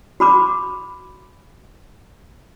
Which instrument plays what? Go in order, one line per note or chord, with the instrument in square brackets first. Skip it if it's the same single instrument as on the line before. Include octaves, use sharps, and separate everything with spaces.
[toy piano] F#4 B5 D6